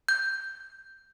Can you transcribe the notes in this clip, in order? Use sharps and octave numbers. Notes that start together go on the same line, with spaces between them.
G6